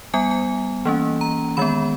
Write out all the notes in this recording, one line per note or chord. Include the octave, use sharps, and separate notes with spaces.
G3 B3 G#5
G#5
E3 A#3 C#4
A#5
D#3 G#3 B3 B5